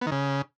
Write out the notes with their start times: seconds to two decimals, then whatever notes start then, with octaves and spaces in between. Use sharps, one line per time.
0.01 B3
0.07 D#3
0.12 C#3